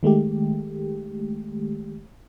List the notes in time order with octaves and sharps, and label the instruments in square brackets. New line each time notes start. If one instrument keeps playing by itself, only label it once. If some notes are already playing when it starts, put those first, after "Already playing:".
[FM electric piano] D#3 G#3 A3 G4